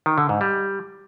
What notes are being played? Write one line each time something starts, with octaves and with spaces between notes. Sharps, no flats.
D#3
D3
G#2
G3